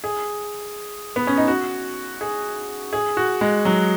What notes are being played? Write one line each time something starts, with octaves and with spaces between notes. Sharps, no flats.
G#4
B3
C#4
D#4
F#4
G#4
G#4
F#4
G#3
F#3